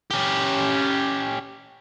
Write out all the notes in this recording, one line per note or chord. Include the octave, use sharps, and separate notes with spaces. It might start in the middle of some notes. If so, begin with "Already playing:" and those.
C#4 G4